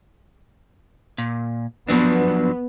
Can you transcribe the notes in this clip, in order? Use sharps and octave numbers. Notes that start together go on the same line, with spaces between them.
A#2
F3 F#3 B3 D4